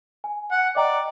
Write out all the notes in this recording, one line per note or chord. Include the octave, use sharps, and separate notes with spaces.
G#5
F#5
D5 D#5 G5 A#5